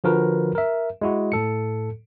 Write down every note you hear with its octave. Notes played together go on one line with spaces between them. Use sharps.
D3 F3 F#4 A#4 B4
A#4 E5
G#3 E4 F#4
A2 A4 C#7